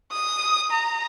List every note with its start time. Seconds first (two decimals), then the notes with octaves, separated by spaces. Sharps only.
0.12 D#6
0.71 A#5